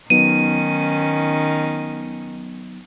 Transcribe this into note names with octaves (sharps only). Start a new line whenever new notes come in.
D#3 F#3 B3 C#4 D#4 D#7